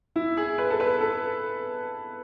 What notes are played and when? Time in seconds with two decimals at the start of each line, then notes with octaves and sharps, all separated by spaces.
0.16 E4
0.37 G#4
0.58 B4
0.70 A4
0.80 B4
1.00 A4